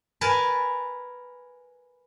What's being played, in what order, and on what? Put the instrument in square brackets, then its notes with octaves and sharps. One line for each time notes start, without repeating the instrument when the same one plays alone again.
[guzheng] A#4 B4 G#5 A5